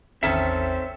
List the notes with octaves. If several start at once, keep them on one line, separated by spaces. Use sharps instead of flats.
A1 E2 D#3 C4 C#4 A4 E5